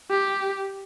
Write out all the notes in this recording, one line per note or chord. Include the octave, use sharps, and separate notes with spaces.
G4